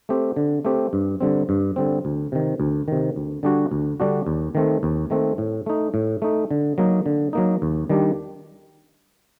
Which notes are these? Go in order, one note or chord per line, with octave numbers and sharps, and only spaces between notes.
A3 C4 G4
D3
A3 C4 G4
G2
D3 G3 C4
G2
D3 G3 C4
D2
C3 D#3
D2
C3 D#3
D2
D3 G3 D4 F#4
D2
D3 G3 D4 F#4
D#2
D#3 A3 C4
D#2
D#3 A3 C4
A2
A3 D#4
A2
A3 D#4
D3
F#3 A#3 D#4
D3
F#3 A#3 D#4
D#2
D#3 G3 D4 G4